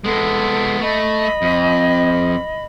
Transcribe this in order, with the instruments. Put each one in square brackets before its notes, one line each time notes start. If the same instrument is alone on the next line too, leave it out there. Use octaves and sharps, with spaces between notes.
[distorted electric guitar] G#3 B3 [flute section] A4
[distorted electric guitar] A3 [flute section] D#5 B5
[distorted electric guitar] F2